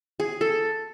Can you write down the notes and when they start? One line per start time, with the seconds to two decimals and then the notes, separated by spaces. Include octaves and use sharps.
0.20 G#4
0.41 A4